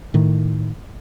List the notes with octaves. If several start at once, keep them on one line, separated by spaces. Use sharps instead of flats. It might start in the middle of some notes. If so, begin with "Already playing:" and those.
A2 D#3